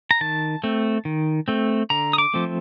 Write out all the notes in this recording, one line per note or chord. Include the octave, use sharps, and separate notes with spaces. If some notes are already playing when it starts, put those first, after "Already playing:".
A#5
D#3 A5
A3 C4
D#3
A3 C4
D3 A#5
D#6
D6
F3 A3 C4